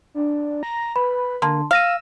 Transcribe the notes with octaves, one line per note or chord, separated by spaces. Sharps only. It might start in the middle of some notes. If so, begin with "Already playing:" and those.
D4
A#5
B4 B5
D3 A#3 A5 C6
F5 E6 F6 A#6 D#7